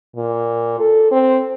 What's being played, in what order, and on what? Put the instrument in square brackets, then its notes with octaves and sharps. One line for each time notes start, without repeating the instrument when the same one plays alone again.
[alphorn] A#2
A4
C4